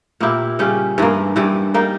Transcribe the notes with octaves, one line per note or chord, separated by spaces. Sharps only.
A#2 A#3 E4 G4
C#3 G3 C#4
G2 E3 A#3
G2 E3 G3
G3 A#3 D#4